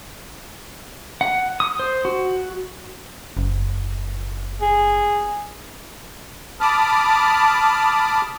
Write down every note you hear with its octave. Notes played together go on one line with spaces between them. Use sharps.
F#5
D#6
C5
F#4
F#1
G#4
A5 B5 D6 D#6 F6